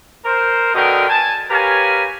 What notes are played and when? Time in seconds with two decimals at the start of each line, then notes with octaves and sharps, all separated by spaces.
0.25 A#4 C5
0.74 B2 D3 A#4 D#5 G5
1.08 G#5 A5
1.50 G4 A#4 B4 C#5 F5 G#5